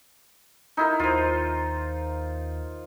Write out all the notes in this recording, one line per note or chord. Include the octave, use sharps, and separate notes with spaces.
D#4 E4 A#4
D#2 F4 C5